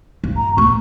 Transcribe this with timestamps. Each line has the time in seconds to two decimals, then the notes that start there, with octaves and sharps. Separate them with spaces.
0.24 G2
0.37 A#5
0.57 D#2 A3 C#6